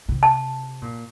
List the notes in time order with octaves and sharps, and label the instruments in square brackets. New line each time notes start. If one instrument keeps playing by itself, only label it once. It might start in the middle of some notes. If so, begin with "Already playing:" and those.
[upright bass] C3
[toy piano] A5
[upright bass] A#2